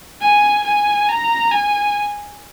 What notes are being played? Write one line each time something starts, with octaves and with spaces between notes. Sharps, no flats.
G#5
G#5
A#5
G#5